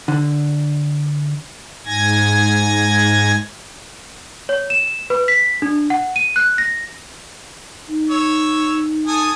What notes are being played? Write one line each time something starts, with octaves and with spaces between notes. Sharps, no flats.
D3
G#2 G#5 G#6 A#6
C#5
E7
B4
B6
D4
F#5
D#7
F#6
A#6
D#4
C#5 E6
A4 G#5 D#6